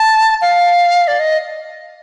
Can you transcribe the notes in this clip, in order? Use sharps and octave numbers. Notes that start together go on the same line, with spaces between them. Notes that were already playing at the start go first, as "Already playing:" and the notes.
Already playing: A5
F5
D5
D#5